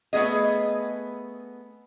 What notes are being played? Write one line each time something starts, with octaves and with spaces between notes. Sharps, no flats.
A3 B3 G#4 D#5